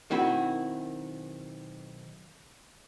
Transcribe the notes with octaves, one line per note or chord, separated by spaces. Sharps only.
B1 D#3 C4 E4 F#4 B5